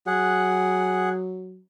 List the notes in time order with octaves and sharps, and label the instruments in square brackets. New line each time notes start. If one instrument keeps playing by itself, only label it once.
[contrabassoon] F#3 [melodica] G#4 F#5